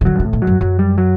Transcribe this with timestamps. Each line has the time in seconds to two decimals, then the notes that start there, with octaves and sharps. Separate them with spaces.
0.01 C3
0.05 D3 F#3
0.15 G2
0.20 C3
0.25 A2
0.33 B2
0.42 F#3
0.47 F#2
0.61 F#2 F#3
0.79 G3
0.98 F#3